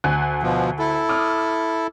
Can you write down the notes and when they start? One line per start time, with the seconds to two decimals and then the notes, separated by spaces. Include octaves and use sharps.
0.04 D2 G#5 F#6
0.43 B2 F3
0.79 E4 A4
1.09 D6 D#6 F6